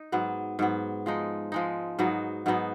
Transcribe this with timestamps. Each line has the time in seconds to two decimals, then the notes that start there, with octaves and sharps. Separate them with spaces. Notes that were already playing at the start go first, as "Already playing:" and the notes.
Already playing: D#4
0.12 G#2 F#3 B3
0.59 G#2 F#3 B3
1.06 F3 G#3 D#4
1.52 F3 G#3 D#4
1.99 G#2 F#3 B3 D#4
2.46 G#2 F#3 B3 D#4